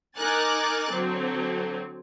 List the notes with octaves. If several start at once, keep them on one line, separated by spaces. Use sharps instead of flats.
D#4 A#4 G#5 D6 F#6 A6
D3 F#3 C4